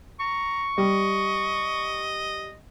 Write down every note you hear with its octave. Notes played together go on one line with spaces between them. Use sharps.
A#5 C#6
G3 D#5